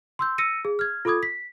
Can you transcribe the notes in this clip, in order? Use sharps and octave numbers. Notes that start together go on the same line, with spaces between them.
C6 E6 G6
E6 A#6 C#7 D#7
G#4
F6 G#6
F4 A4 B5 D6 D#6 G#6
B6